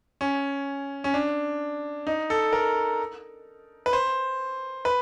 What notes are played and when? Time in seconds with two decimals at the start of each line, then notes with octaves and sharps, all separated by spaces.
0.21 C#4
1.04 C#4
1.14 D4
2.07 D#4
2.30 A4
2.53 A#4
3.86 B4
3.93 C5
4.85 B4